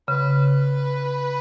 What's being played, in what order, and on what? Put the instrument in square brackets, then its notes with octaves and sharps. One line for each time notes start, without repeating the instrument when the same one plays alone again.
[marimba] C#3 [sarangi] B4